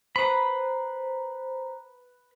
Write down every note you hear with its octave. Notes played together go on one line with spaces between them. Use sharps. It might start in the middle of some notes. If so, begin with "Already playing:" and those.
B4 C5 A#5 B5